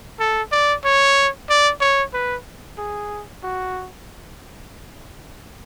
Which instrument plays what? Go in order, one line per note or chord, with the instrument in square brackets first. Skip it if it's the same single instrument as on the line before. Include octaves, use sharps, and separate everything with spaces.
[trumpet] A4
D5
C#5
D5
C#5
B4
G#4
F#4